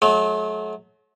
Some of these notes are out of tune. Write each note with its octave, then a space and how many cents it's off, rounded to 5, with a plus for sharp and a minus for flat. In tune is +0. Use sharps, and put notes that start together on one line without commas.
F#3 -15 A3 -40